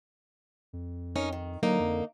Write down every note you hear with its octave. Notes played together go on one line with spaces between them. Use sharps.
F2
C#4 D#4 A#4
D#3
D3 F#3 A#3 D#4
F2